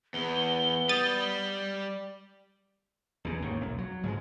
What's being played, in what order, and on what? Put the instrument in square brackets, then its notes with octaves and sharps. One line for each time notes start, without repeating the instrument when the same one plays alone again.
[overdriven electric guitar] E2 [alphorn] B3 [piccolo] G7
[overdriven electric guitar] G3 [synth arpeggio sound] D#6 A6
[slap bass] E2 C#3
D#2 G#2 D#3
B1 F#2
F#3
G#2 C#3 F#3 G#3